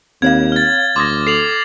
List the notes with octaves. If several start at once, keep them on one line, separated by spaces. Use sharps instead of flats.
D#2 C4 C#5 F5 G#6
F6 A6
D2 C6 D6 D#6 G#6 A#6
A4 C7 F7 F#7